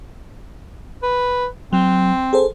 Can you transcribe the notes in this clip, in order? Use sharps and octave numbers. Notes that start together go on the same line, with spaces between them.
B4
F#3 C4
G#4 A4 C5